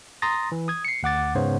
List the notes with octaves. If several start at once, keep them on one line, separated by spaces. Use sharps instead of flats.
A#5 C6 D#6 A6 A#6
E3
D#6 G#6
C7 C#7
D2 F#5 D6 A6
G#2 C#3 B3 C5 C#5